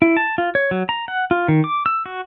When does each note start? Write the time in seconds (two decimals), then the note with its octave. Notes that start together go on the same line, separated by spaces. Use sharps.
0.02 E4
0.17 A5
0.38 F4
0.55 C#5
0.71 F#3
0.89 A#5
1.08 F#5
1.31 F4
1.48 D#3
1.64 D6
1.86 E6
2.06 F#4